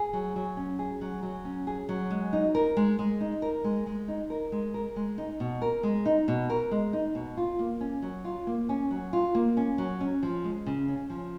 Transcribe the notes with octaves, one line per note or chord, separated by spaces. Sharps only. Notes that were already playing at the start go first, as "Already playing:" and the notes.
Already playing: G#4
F#3
F#3
C#4
G#4
F#3
F#3
C#4
G#4
F#3
G#3
D#4
A#4
G#3
G#3
D#4
A#4
G#3
G#3
D#4
A#4
G#3
A#4
G#3
D#4
B2
A#4
G#3
D#4
B2
A#4
G#3
D#4
B2
F4
A#3
C#4
F#3
F4
A#3
C#4
F#3
F4
A#3
C#4
F#3
C#4
F3
G#3
C#3
C#4
F3